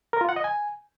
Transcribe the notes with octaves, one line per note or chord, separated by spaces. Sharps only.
A#4
F4
F#5
D#5
G#5